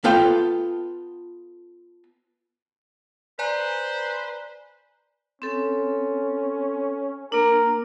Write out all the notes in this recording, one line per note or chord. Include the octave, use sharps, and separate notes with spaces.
B3 F4 A4 G5
B4 C5 D5 G#5 A#5
C4 C#4 A4
A#3 D4 A#4